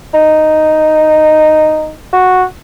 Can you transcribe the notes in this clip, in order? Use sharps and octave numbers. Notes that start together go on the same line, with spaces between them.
D#4
F#4